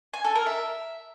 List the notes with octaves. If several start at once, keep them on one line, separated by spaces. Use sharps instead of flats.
G#5
A4
A#4
E5